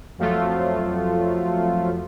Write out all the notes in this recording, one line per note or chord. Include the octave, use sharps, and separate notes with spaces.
F2 F3 F#3 A3 F4